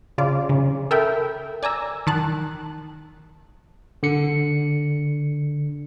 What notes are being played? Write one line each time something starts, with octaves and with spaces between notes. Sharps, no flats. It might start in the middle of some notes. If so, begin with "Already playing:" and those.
C#3 F4 D5
C#3
A4 A#4 E5 G5 B5
D5 G#5 A#5 E6
D#3 A5 F#6
D3 C#7